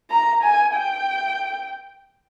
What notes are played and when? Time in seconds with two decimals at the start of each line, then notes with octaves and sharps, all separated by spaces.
0.11 A#5
0.43 G#5
0.75 G5